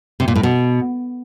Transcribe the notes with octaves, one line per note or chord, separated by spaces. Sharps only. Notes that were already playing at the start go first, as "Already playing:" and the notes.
C3
A#2
A2
B2